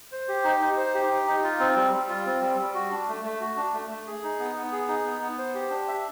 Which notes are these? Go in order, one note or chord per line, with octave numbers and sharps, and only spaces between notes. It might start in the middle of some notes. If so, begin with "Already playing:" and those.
C5
G4
D#4
D#4
C5
G4
D#4
D#4
F4
C4
G3
G3
F4
C4
G3
G3
F#4
D4
A3
A3
F#4
D4
A3
A3
G#4
D#4
B3
B3
G#4
D#4
B3
B3
C5
G4
D4
E5